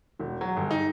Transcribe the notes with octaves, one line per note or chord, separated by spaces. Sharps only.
E1
F#3
G1
D#4